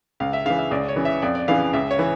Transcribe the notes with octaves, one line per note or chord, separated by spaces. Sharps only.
C#2 F5
E5
C#3 E3 F5
E5
C#2 D5
C#5
C#3 E3
E5
F2 D5
D5
C#3 E3 F5
C#2 E5
C#5
E3